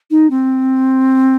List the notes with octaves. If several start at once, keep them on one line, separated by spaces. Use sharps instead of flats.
D#4
C4